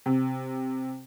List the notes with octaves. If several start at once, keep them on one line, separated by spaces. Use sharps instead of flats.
C3